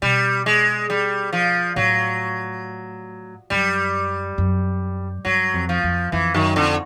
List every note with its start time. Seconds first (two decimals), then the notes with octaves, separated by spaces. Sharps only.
0.02 B2 G3
0.46 G#3
0.90 G3
1.33 F3
1.76 A2 F#3
3.50 F#2 G3
4.38 F#2
5.25 G2 F#3
5.54 F2
5.69 F3
5.84 F2
6.12 F2 E3
6.34 F#2 D#3
6.56 F2 D3